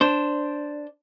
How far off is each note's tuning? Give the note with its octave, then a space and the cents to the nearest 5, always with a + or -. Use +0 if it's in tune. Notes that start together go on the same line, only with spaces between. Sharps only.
D4 +0 C5 +0